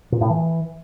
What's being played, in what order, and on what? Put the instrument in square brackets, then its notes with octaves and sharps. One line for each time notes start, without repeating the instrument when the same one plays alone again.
[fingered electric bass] A#2
A2
E3